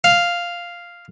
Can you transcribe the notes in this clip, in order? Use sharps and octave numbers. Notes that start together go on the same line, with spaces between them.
F5